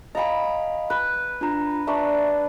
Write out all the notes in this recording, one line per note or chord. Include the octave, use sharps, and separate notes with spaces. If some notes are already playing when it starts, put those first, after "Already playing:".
D#5 F5 G#5 A#5 B5
B4
D4 F4 A#5
D4 B4 E5 A#5 C#6